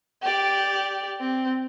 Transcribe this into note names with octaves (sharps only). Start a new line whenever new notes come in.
G4 D5
C4